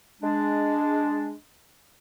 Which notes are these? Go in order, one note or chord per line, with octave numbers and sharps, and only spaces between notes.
G#3 D4